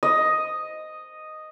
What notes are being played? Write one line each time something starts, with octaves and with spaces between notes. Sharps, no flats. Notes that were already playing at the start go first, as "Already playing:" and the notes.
D#5